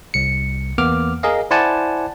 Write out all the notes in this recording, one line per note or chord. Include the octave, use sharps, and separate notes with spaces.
C2 C#7
E2 A#3 B3 D6 F6
G#4 A#4 D#5 F5
E4 C5 D5 F#5 G#5 A5